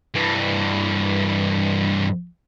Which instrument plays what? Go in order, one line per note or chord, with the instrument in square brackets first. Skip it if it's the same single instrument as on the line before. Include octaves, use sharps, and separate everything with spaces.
[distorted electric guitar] G2 E3